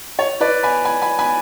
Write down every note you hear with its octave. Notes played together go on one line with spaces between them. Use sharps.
C#5
B4 D5
G#5 B5
G#5 B5
G#5 B5
G#5 B5